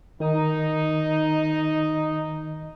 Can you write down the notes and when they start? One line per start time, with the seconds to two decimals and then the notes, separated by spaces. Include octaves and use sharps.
0.20 D#3 D#4